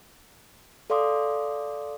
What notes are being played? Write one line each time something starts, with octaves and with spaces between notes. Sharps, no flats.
A4 D5 F5 C6 D6 D#6